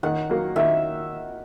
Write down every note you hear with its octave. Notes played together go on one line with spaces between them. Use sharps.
D#3 F#5
F#3 A#3
D#3 E5